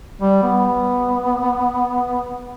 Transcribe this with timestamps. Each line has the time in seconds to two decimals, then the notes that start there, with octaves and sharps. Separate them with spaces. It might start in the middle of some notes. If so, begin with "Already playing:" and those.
0.22 G3
0.43 B3